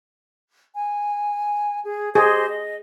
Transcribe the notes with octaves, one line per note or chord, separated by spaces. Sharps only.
G#5
G#4
G4 G#4 C5 D#5
D#5